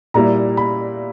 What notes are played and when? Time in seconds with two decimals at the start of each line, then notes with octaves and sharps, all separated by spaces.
0.14 A#2 G3 A#3 E4 A#5
0.57 B5